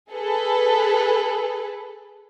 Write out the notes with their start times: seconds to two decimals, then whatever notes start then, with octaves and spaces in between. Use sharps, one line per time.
0.12 G#4 A4 B4